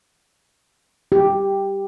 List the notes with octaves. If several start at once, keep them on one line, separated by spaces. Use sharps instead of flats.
G4